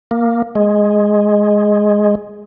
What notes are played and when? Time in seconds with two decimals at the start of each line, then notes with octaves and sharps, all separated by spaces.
0.11 A#3
0.55 G#3